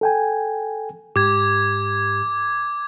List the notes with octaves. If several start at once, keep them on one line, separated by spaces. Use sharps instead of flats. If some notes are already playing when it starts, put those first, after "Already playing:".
A4 G5 G#5
G#2 G4 D6 G#6